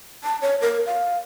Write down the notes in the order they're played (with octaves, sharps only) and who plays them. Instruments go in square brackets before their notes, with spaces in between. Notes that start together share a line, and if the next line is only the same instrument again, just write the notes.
[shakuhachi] A5
C#5
A#4
F5